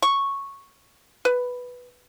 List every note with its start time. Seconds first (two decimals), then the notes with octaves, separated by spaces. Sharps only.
0.02 C#6
1.25 B4